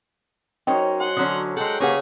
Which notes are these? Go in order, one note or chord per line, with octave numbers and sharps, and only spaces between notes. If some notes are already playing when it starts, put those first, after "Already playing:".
F#3 C#4 D#4 A#4 C5 D#5 G5
F#5 G#5 C6
D3 F#3 C#4 D#6
G#3 A4 F#5 G5
C#3 A#3 G4 G#4 B4 C#5 F#5